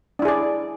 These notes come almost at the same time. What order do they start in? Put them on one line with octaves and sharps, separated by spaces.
D4 E4 G#4 D5